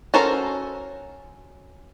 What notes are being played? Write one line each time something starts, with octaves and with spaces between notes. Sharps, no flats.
C#4 F#4 A4 A#4 C5